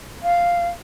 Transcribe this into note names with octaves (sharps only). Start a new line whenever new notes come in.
F5